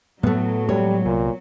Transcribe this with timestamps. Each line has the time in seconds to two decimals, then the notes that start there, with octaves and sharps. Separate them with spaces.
0.23 A2 F#3 A3 B3
0.69 A2 G3 G#3 C#5
1.05 C2 A#2